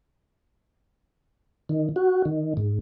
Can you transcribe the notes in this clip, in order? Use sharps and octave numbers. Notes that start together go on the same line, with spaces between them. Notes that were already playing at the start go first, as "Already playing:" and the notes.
D#3
F#4
D#3
G#2